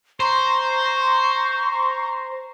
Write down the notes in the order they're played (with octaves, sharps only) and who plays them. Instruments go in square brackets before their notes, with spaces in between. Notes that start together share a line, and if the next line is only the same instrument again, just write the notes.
[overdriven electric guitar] C5 [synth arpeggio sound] A#5 C6 [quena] C#6